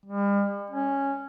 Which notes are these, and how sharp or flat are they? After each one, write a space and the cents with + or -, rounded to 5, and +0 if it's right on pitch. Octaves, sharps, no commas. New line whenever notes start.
G3 +45
C#4 -5